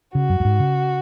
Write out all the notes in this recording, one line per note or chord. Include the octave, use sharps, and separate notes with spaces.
C#3 F#4
F#2
F#2
G#2
C#3